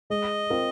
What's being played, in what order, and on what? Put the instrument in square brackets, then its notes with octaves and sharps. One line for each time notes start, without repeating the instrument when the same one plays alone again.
[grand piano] G#3 [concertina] D#5
[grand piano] C4 F4 A#4